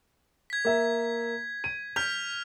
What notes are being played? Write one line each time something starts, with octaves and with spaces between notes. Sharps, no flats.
G#6 B6
A#3 E5
D#7
F6 G6 B6 F7